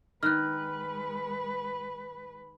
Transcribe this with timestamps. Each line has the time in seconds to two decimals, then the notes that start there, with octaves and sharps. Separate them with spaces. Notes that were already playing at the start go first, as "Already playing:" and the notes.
0.23 D#3 G#3 B4 F6 F#6